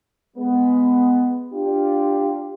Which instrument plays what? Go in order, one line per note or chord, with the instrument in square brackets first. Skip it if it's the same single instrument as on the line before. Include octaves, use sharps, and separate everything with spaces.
[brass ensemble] G#3 B3
D4 F4 G4